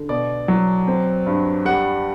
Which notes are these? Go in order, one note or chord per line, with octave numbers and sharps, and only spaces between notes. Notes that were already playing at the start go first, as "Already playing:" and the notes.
Already playing: D3
B2 D5
F#3
C4
G2
G3 F#5